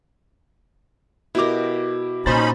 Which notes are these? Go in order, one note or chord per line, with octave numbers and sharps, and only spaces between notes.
B2 E4 G4 A#4 D6
A#2 C#4 D#4 C5 B5 A6